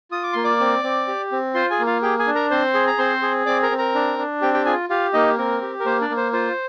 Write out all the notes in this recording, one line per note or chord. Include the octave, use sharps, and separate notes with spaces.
F4 D#6
D6
A#3 C6
D5 D6
C4
C4
G4
C4
F4 C5 C6
G#4 G#5
A#3
F4 F5
G4 G#4 G5
G#4 G#5
D4
A#4 A#5
C4 C5 C6
G#4
A#5
C4 C5 C6
G#4
C4 D5 D6
A#4 A#5
C4
A#4 A#5
D4
D4
C4 G4 G5
G4 G5
F4 G#4 G#5
F4 G4 F5
A#3 D#4 D#5
C4 A#4
G4
A#4
A#3 C5
D4 D5
A#3
C5
F4 C5